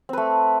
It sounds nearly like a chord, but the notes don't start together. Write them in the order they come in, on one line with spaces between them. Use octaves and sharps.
C4 B4 A3